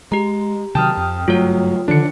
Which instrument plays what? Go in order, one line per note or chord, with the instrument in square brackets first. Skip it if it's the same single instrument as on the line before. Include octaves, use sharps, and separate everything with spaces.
[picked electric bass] G#3 [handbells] G4 A#5
[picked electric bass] C3 D#3 F#3 [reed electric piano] G5 D#6 F6 [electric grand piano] A5
[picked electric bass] F2
[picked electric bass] F#1 G2 A3 [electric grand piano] F#3 [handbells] F4 C#5
[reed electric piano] D3 [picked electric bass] D#3 F3 [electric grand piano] D4 C#7